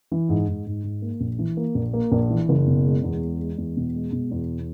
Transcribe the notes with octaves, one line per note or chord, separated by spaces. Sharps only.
E3
G#2
G#2
G#2
G#2
A#3
A#1
E3
A#3
A#1
A#3
A#1
E3
F#1
B2
G#3
E2
G#3
G#3
E2
B2
G#3
B2
E2